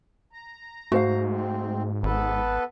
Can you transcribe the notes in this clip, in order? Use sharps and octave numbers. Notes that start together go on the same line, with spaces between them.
A#5
G#2 A3 F#4 C5 F5
C4
G#1 B3 A4 B4